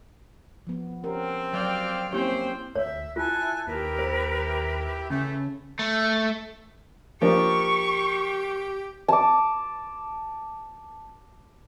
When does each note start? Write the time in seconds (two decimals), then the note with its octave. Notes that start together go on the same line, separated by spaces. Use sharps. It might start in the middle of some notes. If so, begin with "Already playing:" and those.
0.67 F3 B3
1.04 C4 C#4 G4 A#4
1.53 F#3 D5 F5 G5
2.13 A#3 C4 C#4 E4 G4 C5 G5
2.75 D2 C#5 E5
3.16 E4 F4 A4 G#5 F#6
3.67 D#2 E4 G4 A#4 B4
3.99 C5
5.10 C#3 E3 A3 C#4
5.79 A3
7.22 F3 A#3 D4 G4 C#6
9.08 A5 D6